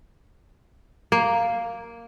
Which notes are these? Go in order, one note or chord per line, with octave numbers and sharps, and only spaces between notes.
A#3